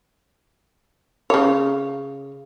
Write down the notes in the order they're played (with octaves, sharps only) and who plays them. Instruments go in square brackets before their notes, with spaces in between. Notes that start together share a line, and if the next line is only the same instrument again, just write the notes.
[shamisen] C#3 C#5